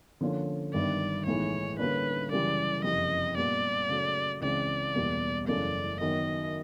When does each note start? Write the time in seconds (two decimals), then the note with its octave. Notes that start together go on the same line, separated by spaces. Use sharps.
0.21 D3 F3 A#3 C#4
0.73 G1 G2 D#3 D5
1.26 B1 A2 E3 G#3 C#5
1.79 D3 G3 A#3 C#4 B4
2.31 F#2 C#3 E3 G3 D5
2.84 F#1 F2 C3 D#5
3.37 A#2 G3 B3 D5
3.89 C#3 F#3 A3
4.42 C#2 C#3 E3 G#3 C4 D5
4.95 E1 E2 B2 G3 A#3
5.47 F#1 F#2 C#3 E3 A3 D5
6.00 F#2 D#3 F#3 B3 D#5